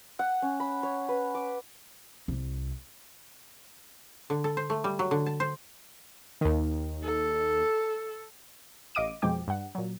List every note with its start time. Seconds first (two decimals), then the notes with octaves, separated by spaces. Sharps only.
0.19 F#5
0.42 C#4
0.60 B5
0.83 C#5
1.09 B4
1.35 D6
2.28 C2
4.30 D3
4.44 A4
4.57 C5
4.70 A3
4.84 G3
4.99 F#3
5.11 D3
5.26 A5
5.40 C5
6.41 D#2 D#3
7.04 A4
8.95 A1 D#5 F5 D6 D7 D#7
9.22 F2 B2 F3 G#3 G5 D6
9.48 G2 F#5
9.75 A#2 F#3